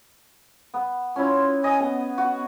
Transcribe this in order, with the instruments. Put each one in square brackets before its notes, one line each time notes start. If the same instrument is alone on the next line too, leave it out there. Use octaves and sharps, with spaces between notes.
[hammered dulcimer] B3
[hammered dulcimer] C#4 E4 [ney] F4
[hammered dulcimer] D#5 [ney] G#5
[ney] B3
[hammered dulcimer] F#4